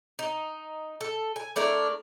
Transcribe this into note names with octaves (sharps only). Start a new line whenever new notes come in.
D#4
A4
G#5
A3 D4 E4 A#4